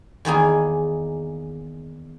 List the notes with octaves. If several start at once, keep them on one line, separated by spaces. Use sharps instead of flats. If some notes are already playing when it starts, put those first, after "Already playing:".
E2 D#3 A#3 G#4